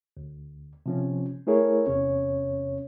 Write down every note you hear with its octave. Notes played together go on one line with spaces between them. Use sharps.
D2
C3 F3 C#4
A3 E4 G#4 A#4 C#5
E2 C3 C#4 C#5